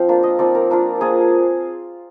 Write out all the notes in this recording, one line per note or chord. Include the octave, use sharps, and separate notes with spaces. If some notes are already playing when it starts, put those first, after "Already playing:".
Already playing: F3 C4 F5 G5
A#3 D4 F4
D#5
F3 C4 D#4 D5
A#4
A#3 D4 F4
A#3 D4 F4 G#4